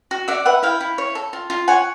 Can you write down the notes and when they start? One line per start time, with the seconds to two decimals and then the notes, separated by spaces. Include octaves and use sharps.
0.11 F#4
0.28 D5 E5 F#5
0.45 B4 E5 F#5
0.63 E4 F5 G5
0.81 E4
0.98 C#5
1.15 A4
1.33 F4
1.50 F4
1.68 C#5 F#5 G#5